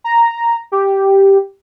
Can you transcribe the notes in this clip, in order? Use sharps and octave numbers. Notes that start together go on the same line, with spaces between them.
A#5
G4